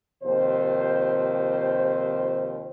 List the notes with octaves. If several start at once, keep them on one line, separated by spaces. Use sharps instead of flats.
D#2 C3 F3 C5